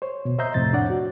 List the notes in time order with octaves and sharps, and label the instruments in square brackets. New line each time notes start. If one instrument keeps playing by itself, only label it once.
[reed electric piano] C5 C#5
B2
C5 D#5 E5 A#5 C6 G6
F2 A2 C3 A6
D4 C#5 D5 F#5
F#4